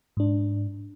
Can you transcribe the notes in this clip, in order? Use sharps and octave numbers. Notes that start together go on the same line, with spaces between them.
G#2 D4